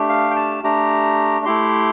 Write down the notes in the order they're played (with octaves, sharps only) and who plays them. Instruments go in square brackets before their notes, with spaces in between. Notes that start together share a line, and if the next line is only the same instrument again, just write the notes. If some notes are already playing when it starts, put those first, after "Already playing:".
Already playing: [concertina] A3 D4 G4
F5
G5
A5
A3 D4 G4 A#5
A3 E4 G4 C6